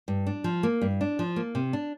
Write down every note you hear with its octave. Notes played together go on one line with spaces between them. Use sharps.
G2
D4
F3
A#3
G2
D4
F3
A#3
C3
D4